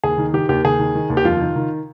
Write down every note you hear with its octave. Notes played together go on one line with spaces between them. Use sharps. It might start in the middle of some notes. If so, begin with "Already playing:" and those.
D#2 G#4
D#3
D#3 G4
D#2 G4
D#2 G#4
D#3
D#3
D#2
G4
F2 F4
D#3
D#3